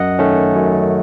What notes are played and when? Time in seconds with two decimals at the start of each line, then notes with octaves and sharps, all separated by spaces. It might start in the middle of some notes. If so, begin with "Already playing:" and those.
Already playing: F#2 D#5 F#5
0.19 D#3 A3 C#4
0.55 F#2